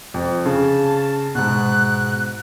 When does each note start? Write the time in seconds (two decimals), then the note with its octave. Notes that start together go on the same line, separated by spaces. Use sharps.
0.14 F2
0.46 C#3 A5
1.35 G#2 B2 F#6